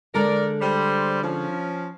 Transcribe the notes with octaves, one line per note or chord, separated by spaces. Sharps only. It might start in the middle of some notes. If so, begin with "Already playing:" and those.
D3 G#3 A4 A#4 D5
G3 C5
F3 C#4